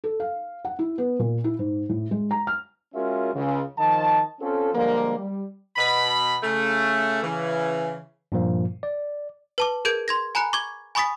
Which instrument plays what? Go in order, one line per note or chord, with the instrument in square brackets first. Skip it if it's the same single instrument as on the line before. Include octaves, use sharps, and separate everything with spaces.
[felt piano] A4
F5
F#5
E4
B3
A#2
E4
G#2
A2
G#3
A#5
F6
[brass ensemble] G#3 C#4 F4 F#4 A#4 E5
C#2 C#3
D#3 F3 D#5 A5
C4 C#4 F4 A4
D3 F3 G3 G#3 A#3
G3
[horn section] B2 B5
C#3 A3
C#3 E3
[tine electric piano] G2 A#2 F3 A#3
D5
[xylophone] B4 A5 D6
G#4 A#4 G6 G#6 D7
C6 G#6 A#6
G#5 A#5 B5 F#6 C#7
C#6 D6 G#6
G#5 B5 C#6 D#6 A6 B6